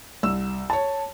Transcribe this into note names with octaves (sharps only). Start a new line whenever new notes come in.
C2 E6
C#5 A5